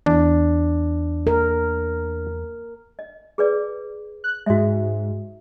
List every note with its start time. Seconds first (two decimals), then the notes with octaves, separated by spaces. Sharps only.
0.06 E2 D4
1.27 A#4
2.99 D#5
3.38 G#4 B4 D5
4.24 F#6
4.46 G#2 G#3 F#4 E5